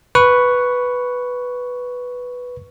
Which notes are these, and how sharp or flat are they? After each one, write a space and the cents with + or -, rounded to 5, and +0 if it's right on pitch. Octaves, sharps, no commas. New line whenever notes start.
B4 +0 C#6 +5